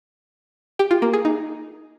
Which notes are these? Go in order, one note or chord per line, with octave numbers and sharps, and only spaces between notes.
G4
F4
A#3
G#4
D#4